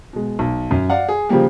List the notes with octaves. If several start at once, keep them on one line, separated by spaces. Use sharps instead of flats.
B2 G#3
B1
F#2
D5 F5 F#5
G#4
C#3 F3 G3 A#3 G4